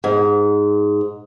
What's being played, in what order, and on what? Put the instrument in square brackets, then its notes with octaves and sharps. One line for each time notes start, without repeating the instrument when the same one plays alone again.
[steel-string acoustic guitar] G#2